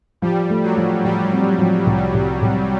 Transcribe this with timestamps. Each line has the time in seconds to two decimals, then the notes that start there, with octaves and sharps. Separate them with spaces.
0.22 F3 G3
0.50 A3
0.63 F#3
0.77 F3
1.05 F3 G3
1.32 C4
1.59 F3
1.86 C2
2.14 C2
2.42 C2